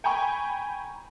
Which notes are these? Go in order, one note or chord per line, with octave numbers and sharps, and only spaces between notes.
G5 G#5 A#5 B5 C#6